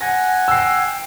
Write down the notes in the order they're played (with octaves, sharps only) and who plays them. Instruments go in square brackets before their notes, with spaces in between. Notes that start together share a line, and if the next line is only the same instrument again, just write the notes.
[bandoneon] F#5 G#5 [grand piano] A#6
[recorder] G5 [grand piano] E6 C7